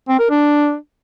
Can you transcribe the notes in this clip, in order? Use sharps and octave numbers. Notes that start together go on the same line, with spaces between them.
C4
A#4
D4